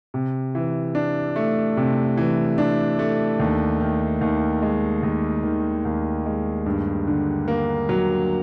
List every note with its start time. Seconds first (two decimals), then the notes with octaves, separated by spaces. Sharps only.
0.14 C3
0.55 E3
0.95 D4
1.36 A3
1.77 C3
2.17 E3
2.58 D4
2.99 A3
3.39 D#2
3.81 D#3
4.21 D#2
4.62 G#3
5.03 D#2
5.43 D#3
5.85 D#2
6.26 G#3
6.66 G2
7.07 D3
7.48 A#3
7.89 F#3